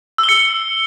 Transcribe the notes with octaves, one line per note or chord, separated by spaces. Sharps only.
E6
G7
C#7